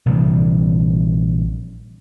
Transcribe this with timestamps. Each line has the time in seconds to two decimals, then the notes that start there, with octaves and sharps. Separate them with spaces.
0.06 A#1 C3 E3 G3